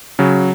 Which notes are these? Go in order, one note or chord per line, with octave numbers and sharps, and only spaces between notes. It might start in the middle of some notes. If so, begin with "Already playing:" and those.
C#3 F#3